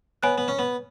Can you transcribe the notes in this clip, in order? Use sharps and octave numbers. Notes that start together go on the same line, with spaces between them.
B3 C#5 G#5 B5 F#6
B3
C#4
B3